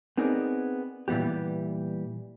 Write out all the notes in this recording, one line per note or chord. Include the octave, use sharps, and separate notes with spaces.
B3 C4 D#4 G#4 A#4 D5
A#2 E3 G3 B3 G4